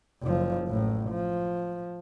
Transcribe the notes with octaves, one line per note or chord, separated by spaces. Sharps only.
F#1 F3
A1 A2
F3